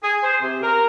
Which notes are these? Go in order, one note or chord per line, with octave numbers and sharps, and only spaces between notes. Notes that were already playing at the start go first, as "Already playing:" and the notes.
G#4
C5
C3
A#4